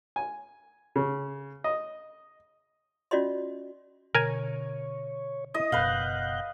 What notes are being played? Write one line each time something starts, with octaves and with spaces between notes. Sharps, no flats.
G#5
C#3
D#5
C#4 F4 F#4 D5 D#5 C6
B2 D3 A#4 C#5 G#5
E4 D#5 D#6
F#1 B2 B4 F5 F#5 F#6 G6